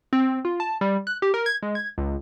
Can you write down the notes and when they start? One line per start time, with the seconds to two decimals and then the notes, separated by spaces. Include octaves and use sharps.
0.13 C4
0.45 F4
0.60 A5
0.81 G3
1.07 F#6
1.22 G4
1.34 A#4
1.46 G#6
1.63 G#3
1.75 G#6
1.98 C#2